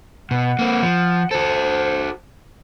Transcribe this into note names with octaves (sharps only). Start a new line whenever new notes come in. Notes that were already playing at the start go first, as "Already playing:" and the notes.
B2 F#5
A#3 C4
F3
F#4 A4 C5